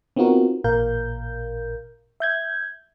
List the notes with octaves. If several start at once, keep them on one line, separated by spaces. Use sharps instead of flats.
B3 C4 D#4 F4 F#4 A#4
A1 A#2 A#4 F5 G6
E5 G6 G#6